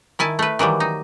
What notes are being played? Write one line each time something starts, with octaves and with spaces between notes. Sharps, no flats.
D#3 E4 G#5 A5
A3 B4
D#3 E3 F#3 G3
D#4